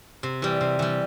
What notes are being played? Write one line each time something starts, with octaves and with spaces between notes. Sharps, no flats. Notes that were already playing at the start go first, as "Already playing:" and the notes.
C3
E3 G3
C3
E3 G3